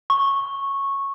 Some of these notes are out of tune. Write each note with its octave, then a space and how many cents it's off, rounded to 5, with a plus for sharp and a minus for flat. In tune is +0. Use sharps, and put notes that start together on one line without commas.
C#6 -10